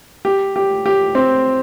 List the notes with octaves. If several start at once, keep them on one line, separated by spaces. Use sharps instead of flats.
G4
G4
G4
C4